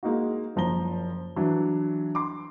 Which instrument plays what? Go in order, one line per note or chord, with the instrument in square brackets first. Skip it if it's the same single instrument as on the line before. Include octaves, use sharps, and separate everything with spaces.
[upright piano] G#3 A#3 D#4 F#4
F#1 F3 A#5 G7
E3 F#3 D4
C6 D6